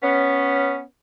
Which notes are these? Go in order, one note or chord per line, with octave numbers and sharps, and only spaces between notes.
B3 C#4